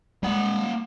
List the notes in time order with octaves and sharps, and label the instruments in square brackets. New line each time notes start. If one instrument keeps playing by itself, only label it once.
[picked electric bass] G3 G#3 [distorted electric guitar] A#3 F#5